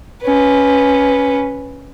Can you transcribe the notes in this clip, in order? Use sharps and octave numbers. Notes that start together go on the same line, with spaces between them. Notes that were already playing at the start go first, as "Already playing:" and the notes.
C#4 B4